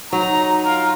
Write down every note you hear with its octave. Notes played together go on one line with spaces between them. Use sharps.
F#3 D#4 A#5
F4 A#4